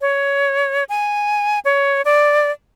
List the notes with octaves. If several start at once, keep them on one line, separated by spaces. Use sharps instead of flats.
C#5
G#5
C#5
D5